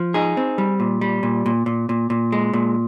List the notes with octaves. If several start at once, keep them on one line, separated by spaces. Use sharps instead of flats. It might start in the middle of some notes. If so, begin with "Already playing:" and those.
Already playing: F3
D#4 G#4
C4
G3
A#2
G3
A#2
A#2
A#2
A#2
A#2
G#3
A#2